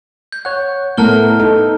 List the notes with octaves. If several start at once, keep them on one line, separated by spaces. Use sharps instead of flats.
G6
C#5 F#5 F#6
A2 A3 B3 A#4 F#5 A5 F6 G7
D#4 A4